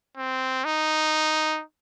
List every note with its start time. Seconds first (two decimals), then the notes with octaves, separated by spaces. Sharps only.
0.18 C4
0.65 D#4